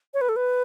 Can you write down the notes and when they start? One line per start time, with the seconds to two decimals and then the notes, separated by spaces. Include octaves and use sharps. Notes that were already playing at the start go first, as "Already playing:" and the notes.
0.14 C#5
0.21 B4
0.29 A4
0.36 B4